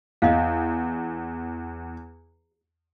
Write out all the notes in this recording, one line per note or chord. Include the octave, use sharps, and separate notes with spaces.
E2 D#5 F5